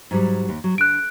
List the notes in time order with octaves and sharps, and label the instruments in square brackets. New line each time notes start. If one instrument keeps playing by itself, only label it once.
[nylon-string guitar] G#2 F#3 G3
D#2
F#3
[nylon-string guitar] D3 [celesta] F#6 D7